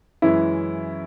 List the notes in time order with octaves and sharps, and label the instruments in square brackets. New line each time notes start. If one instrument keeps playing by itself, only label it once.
[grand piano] F#2 E3 G#3 C#4 [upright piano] E4